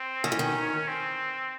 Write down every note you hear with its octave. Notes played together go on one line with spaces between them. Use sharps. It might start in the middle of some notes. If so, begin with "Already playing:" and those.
Already playing: C4
D#3 C#4
E3
D#3
C4